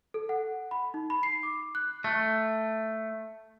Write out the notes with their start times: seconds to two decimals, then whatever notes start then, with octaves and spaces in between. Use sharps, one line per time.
0.14 A4
0.29 F#5
0.71 B5
0.94 D#4
1.10 B5
1.23 C7
1.43 D6
1.75 F#6
2.04 A3